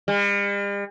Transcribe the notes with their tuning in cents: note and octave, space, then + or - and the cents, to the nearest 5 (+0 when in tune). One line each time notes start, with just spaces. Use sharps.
G3 +45